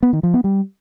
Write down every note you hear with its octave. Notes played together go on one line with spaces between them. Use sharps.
B3
D#3
F3
B3
G3